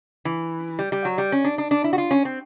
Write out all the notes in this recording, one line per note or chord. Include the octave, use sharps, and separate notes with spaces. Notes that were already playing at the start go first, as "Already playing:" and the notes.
E3
G3
G3
F#3
G3
C#4
D4
D4
D4
E4
F#4
F4
C#4
C4